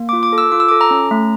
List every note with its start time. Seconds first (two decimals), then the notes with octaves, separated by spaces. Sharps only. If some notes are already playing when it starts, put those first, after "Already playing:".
Already playing: A#3
0.09 F4 D6
0.23 D6
0.33 A4
0.38 E6
0.52 F4 D6
0.60 E6
0.69 A4 D6
0.81 A#5
0.91 C#4
1.11 A3